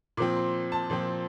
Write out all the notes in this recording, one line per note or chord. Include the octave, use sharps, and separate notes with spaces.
A#2 F3 C4 D6
C6
A5
A#2 F3 C4